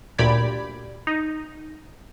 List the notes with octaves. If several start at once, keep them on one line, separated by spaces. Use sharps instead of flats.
D2 A#2 G4 D5 B5 G#6
D#4